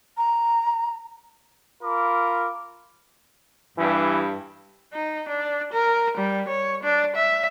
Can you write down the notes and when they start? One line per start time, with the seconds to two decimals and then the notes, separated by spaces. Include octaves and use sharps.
0.17 A#5
1.83 F4 A#4 B5 D6
3.78 G2 E3
4.93 D#4
5.29 D4
5.73 A#4
6.17 G3
6.48 C#5
6.83 D4
7.16 E5